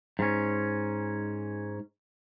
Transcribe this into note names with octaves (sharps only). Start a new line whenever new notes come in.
G#2 C#4